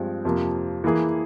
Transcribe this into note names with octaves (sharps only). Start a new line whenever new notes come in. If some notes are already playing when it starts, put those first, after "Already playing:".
Already playing: G2 F3 G#3 C4
F2 C3 F3 A#3
E3 A#3 E4 G#4